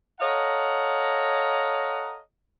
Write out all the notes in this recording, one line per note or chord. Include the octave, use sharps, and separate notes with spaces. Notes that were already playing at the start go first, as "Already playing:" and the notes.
A4 C#5 D#5 F5 F#5 A#5